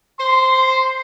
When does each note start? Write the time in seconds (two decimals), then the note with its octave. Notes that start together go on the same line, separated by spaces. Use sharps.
0.19 C5 C6